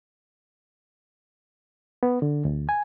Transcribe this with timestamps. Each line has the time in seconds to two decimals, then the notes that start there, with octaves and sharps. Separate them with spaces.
2.03 B3
2.22 D3
2.45 D2
2.69 G#5